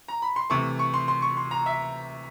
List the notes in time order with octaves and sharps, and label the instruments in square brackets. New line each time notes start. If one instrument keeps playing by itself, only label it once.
[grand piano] A#5
B5
C6
C3 E3 A3 C#6
C#6
C6
C6
C#6
C6
A#5
E5